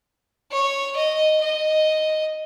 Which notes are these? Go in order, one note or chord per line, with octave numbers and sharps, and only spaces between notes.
C#5
D#5
D#5